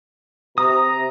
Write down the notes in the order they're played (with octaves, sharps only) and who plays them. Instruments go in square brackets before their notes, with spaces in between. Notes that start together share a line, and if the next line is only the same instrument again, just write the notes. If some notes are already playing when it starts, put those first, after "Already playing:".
[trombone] C3 [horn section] A#5 [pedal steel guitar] D#6